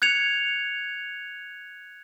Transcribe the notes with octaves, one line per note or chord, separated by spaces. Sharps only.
F#6 G#6 C#7 F7